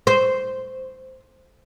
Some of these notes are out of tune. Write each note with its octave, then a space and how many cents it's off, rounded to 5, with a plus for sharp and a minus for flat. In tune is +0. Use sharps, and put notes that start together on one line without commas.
C5 -10